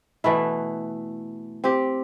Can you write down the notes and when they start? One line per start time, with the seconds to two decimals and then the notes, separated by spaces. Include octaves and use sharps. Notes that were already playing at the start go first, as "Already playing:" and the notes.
0.24 B2 E3 A3 E4
1.64 C4 G4